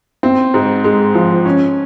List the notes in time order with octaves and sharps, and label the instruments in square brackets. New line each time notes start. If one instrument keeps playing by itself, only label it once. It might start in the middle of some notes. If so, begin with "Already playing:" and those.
[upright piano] C4
G#2
G#3
F3
C#4